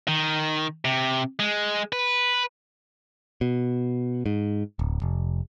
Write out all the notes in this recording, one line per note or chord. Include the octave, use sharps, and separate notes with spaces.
D#3
C3
G#3
B4
B2
G#2
D1
F1